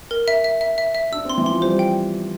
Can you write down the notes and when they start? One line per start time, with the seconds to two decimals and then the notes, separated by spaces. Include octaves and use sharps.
0.11 A#4
0.28 E5
0.44 E5
0.61 E5
0.78 E5
0.95 E5
1.12 D4 E6
1.25 C4 C6
1.38 E3
1.46 F3 C6
1.62 G3 C5
1.79 G5